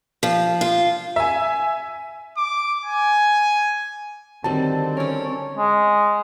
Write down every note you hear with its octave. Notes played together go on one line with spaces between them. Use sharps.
F3
F4
E5 G#5
D6
G#5
D3 D#3 F#3 G3 C4 A5
C#4 A#4 C#5 D5
G#3